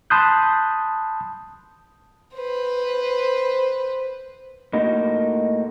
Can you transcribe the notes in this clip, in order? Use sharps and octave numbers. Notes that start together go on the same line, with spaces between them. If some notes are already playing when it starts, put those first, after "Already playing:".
A5 B5 C6 D#6 F#6 G6
B4 C5
A2 A#3 D#4 F#4